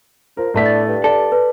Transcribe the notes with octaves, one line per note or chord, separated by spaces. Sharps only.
F3 A#4
A2 A3 B3 D4 B6
A6
G2
A4 D5
B4